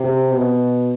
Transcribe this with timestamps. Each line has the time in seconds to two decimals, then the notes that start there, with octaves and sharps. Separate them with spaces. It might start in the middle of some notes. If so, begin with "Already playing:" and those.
Already playing: C3
0.32 B2